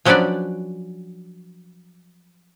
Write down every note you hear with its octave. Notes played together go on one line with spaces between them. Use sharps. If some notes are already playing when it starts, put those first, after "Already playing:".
F3 F#3 C#4 D4 B4 D5